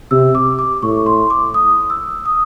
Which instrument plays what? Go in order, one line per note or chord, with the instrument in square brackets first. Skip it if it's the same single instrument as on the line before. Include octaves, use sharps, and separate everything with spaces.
[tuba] C3 [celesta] E6
[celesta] D6
D6
[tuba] A2 [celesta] C#6
[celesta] C6
D6
D#6
E6
D#6